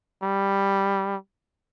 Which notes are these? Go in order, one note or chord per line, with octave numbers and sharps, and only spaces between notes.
G3